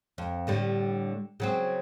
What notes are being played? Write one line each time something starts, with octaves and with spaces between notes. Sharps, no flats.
F2
A2 D3 G3
C#3 F#3 C4